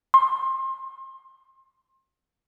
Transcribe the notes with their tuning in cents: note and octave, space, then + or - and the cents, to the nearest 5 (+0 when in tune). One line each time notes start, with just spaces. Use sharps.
C6 +30